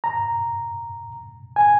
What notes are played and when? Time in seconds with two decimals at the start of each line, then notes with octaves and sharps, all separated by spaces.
0.04 A#5
1.56 G#5